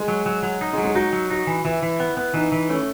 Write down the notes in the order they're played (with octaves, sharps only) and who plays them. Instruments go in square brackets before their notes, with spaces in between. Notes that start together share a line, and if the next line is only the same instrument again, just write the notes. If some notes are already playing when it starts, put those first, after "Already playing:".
Already playing: [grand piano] G#3
[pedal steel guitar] F#3
F#3
F#3
D#4
[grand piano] G#3
[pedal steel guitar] F#3
[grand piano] G#3
[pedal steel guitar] D#4 [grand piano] F#4
[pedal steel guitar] F#3
[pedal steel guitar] D#4 [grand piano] F#4
[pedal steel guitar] E3
[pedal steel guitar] E3 [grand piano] E4
[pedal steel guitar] E3
B3
B3
[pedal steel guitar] E3 [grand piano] D#4
[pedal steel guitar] E3
[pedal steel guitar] A3 [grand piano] C#4